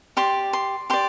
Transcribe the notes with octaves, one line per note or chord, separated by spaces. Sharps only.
G4 D5 C6
C6
G4 D5 C6